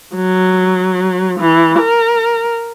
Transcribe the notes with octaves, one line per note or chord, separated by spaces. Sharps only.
F#3
E3
A#4